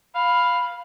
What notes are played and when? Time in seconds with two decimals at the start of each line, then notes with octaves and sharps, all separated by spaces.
0.15 F5 B5